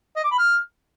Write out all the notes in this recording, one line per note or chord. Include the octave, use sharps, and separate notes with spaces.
D#5
D6
B5
F6